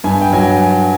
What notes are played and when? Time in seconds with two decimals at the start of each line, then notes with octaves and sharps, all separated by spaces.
0.04 G2 G#5
0.21 G5
0.33 F#3 G#5